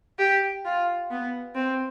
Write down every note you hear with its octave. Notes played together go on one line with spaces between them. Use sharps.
G4
F4
B3
C4